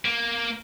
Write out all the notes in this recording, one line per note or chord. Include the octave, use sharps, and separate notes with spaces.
A#3